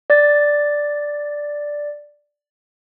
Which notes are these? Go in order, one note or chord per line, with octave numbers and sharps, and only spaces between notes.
D5 A6